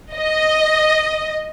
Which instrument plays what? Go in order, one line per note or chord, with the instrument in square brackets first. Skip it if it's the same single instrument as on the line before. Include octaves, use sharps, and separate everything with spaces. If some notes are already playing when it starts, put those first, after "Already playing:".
[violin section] D#5